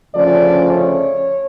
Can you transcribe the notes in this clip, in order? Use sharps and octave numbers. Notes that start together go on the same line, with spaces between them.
D2 C#3 F3 A3 C#4 D5
C#5